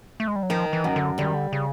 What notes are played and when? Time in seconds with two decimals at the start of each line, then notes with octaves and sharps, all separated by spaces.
0.20 A3
0.28 G#3
0.36 G3
0.43 F#3
0.50 D#3 F3
0.73 E3
0.84 F#2
0.96 D3
1.18 D3 G3
1.26 D#3
1.34 D3
1.53 C#3